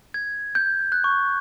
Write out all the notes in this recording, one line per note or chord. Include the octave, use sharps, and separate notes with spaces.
G#6
G6
F#6
C#6